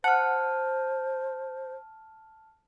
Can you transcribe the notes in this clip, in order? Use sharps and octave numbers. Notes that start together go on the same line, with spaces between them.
C5 F#5 A5 F6